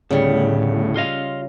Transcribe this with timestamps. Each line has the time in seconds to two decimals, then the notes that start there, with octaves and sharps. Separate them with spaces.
0.11 D2 A2 C#3 G3 B3
0.96 F4 D#5 F5